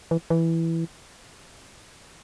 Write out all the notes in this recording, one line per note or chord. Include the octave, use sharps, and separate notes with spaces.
E3
E3